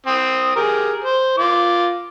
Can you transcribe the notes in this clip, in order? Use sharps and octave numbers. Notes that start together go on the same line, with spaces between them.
C4 D#6
G4 G#4 A#4
C5
F4 D6